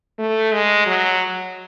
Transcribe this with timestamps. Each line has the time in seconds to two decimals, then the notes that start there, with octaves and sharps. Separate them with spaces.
0.19 A3
0.53 G#3
0.87 F#3